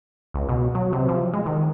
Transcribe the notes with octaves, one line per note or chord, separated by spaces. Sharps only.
C#2
B2
F#3
C3
F3
G#3
D#3